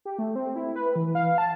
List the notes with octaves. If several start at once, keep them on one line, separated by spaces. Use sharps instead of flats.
G4
A3
C4
E4
B4
E3
F5
A5